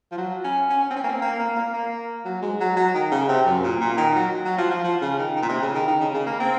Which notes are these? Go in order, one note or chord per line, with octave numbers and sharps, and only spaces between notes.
F3
F#3
C#4
C#4
C#4
C4
C#4
A#3
C4
A#3
A#3
A#3
A#3
F#3
G#3
F#3
F#3
D#3
C#3
C3
F#2
A#2
A#2
D#3
F#3
F#3
F3
F3
F3
C#3
D#3
D#3
A#2
C3
C#3
D#3
D#3
C#3
C#3
A#3
C4